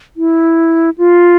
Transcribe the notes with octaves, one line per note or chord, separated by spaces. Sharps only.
E4
F4